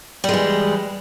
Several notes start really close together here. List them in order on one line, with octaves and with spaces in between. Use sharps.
G3 G#3 E3